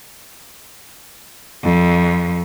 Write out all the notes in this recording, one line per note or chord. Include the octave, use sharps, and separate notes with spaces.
F2